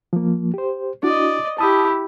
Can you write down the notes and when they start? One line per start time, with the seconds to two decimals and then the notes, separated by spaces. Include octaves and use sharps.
0.13 F3 A#3
0.54 G4 C5
1.03 D4 E4 F#4 D5 D#5
1.58 E4 G4 A5 D#6